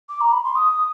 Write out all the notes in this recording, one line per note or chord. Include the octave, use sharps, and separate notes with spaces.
D6
A#5
B5
C6
D#6